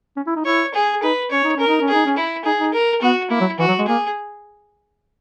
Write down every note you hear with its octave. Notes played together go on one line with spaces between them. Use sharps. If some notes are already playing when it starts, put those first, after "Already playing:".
C#4
E4
D#4
E4 C#5
G#4
D#4 B4
C#4 C#5
D#4
C#4 A#4
D#4
C#4
G#4
D#4
C#4
E4
D#4 G#4
D#4
A#4
B3 F#4
A#3 E4
F#3
E3 F#4
F#3
G#3
A#3 G#4